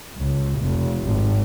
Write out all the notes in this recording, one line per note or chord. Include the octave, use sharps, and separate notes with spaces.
C#2
F1
G#1